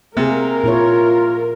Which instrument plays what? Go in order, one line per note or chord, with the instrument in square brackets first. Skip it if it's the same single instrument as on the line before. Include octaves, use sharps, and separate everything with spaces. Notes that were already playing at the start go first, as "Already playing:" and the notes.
[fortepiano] C3 [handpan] A#3 G#4 [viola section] A#4
[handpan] A#2 E4 C#5 [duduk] F4